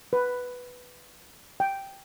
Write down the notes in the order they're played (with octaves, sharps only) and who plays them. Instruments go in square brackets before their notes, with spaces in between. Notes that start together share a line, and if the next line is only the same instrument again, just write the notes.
[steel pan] B4
G5